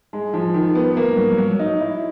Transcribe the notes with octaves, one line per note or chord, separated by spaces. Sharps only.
G#3
F3
D#3
B3
A#3
F#3
F#3
D#4
E4